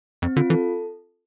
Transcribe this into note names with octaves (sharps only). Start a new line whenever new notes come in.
F2 C4
D3 F4
E3 A4